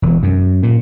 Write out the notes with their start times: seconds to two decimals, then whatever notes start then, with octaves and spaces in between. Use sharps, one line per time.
0.02 E1
0.23 F#2
0.63 A#2